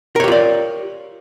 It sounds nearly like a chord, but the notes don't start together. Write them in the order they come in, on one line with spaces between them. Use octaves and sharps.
A#4 C#5 G4 F4 D5